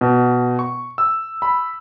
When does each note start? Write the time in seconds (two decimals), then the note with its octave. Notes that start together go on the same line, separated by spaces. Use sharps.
0.01 B2
0.59 C#6
0.98 E6
1.42 B5